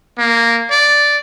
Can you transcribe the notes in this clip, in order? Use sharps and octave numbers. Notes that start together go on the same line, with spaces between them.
A#3
D5